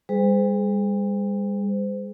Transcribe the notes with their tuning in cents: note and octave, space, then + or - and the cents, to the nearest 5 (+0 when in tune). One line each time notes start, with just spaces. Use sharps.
G3 +40 G#4 +30 C5 -35